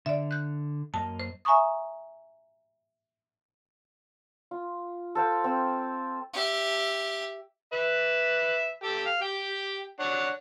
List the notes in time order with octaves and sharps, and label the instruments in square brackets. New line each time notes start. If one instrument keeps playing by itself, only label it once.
[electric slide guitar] D3 [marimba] D5 E5
[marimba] F#6 G6
[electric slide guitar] F#2 A#3 D#5 [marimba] A5
[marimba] C5
E5 G#5 A#5 C#6 D#6
[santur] F4
A4 C5 F5 G5
C4
[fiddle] G4 E5
[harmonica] B4 E5
G4 A4 G5
F5
G4 G5
D4 C#5 F#5